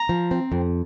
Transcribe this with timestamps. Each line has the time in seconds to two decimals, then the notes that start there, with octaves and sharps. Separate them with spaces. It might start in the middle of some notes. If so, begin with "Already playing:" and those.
Already playing: A#5
0.09 F3
0.31 C4
0.52 F2